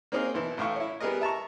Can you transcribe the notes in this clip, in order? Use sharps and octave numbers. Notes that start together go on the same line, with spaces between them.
A#3 C4 C#4 D#4 G#4 A#4
B1 E3
A1 A2 F5 C#6
E4 C#5
G3 B3 G4 G#4 A#4 D#5
E5 A5 A#5 C#6